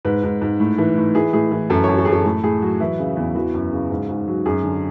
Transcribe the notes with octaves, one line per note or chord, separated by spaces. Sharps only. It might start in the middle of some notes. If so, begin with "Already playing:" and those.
G#2 B4
G#2
G#2
A2
E3
A2
E3 G#4
A2 G#4
E3
F#2 A4
C#5
F#2
A4
F#2 G#4
A4
A2 A4
A2 G#4
F#3 F#4
E3 E4
C#3
E2
E3 F#4
F#2
C#3
G#2
G#2
F#3
F#2 G#4
D3